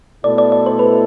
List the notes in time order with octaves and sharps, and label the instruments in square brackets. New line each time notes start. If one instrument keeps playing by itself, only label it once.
[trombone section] B2 A3 E4 A4 [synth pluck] D5
[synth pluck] D5
D5
C5
B4